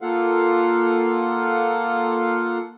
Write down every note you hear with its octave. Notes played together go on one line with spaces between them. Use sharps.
A#3 F4 A4 F5 F#5